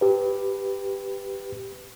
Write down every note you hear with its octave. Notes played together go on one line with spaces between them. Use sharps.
G4 B4